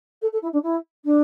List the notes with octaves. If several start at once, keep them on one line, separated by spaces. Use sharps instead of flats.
A4
A4
E4
D4
E4
D4